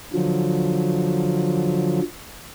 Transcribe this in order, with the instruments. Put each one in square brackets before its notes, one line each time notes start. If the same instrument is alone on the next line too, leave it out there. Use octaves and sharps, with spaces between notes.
[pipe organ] D3 F3 F#3